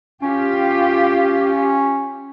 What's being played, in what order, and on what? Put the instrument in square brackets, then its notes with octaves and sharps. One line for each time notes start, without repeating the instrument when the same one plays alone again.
[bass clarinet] C#4 [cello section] F4 G4